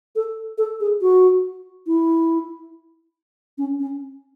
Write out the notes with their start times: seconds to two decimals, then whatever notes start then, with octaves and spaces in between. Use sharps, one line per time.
0.16 A4
0.58 A4
0.80 G#4
1.02 F#4
1.87 E4
3.58 C#4
3.80 C#4